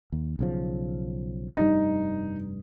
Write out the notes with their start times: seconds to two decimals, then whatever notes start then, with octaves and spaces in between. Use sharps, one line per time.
0.12 D#2
0.39 B1 C#3 F3
1.57 F1 G2 G3 D#4